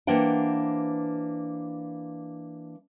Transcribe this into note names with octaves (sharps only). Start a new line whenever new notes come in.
E3 A#3 D4 C5 F#5 G5